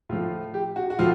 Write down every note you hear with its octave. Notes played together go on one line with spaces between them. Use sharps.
A2 F3 F4
G4
F#4
F#4
A2 F3 F4